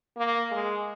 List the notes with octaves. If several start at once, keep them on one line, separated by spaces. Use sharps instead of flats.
A#3
G#3